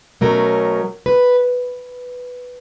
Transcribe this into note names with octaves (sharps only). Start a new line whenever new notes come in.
B2 F#3 A3 C#4 A#4
B4